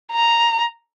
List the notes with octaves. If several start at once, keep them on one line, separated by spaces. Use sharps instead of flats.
A#5